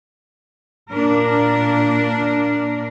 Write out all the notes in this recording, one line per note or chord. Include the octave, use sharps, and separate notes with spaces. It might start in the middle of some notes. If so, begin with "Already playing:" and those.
A#2 D4 A#4